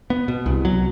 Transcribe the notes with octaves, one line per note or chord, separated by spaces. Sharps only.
B3
B2
C2
F#3